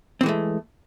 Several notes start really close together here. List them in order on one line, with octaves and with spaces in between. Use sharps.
C4 E3 G#3 A3